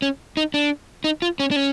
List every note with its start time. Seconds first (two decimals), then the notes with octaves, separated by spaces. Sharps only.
0.02 C#4
0.37 D#4
0.54 D4
1.04 D#4
1.22 F4
1.40 C#4
1.51 D4
1.56 C#4